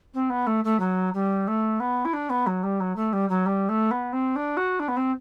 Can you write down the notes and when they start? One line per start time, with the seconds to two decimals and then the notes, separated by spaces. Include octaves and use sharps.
0.14 C4
0.30 B3
0.47 A3
0.64 A3
0.80 F#3
1.14 G3
1.47 A3
1.80 B3
2.05 E4
2.13 D4
2.30 B3
2.47 F#3
2.63 G3
2.80 F#3
2.96 A3
3.13 G3
3.29 F#3
3.46 G3
3.69 A3
3.91 B3
4.13 C4
4.36 D4
4.57 F#4
4.80 D4
4.88 B3
4.97 C4